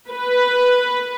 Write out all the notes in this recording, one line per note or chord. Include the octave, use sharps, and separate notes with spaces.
B4